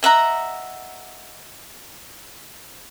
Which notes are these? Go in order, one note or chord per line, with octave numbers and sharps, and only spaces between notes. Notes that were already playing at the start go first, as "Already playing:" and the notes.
D#5 E5 F#5 A#5